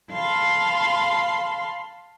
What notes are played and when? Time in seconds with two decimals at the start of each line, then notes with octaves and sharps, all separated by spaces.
0.11 F5 A5 B5 C6